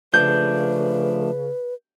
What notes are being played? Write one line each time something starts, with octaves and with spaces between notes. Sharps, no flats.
C#3 F3 A3 D4 B4 G6